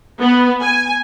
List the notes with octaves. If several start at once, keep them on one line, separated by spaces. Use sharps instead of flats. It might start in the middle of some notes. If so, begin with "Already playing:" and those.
B3
G#5